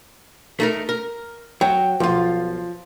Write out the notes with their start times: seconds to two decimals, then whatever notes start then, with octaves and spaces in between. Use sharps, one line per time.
0.60 A3 D#4 A#4
0.89 A#4
1.61 F#3 G5
2.00 B1 F3 F4